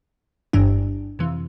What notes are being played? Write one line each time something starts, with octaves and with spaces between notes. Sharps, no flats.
G1 G2 E3 D4
F2 C3 E3